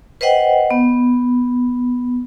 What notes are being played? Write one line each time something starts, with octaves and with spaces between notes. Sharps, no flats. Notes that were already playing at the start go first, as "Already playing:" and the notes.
B4 C5 D#5 F#5 G5
B3